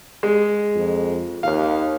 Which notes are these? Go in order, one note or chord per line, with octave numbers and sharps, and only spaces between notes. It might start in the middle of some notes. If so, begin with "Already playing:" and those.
G#3
F2
D#2 F5